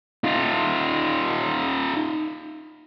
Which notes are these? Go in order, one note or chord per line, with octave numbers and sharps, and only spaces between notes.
D#4 F4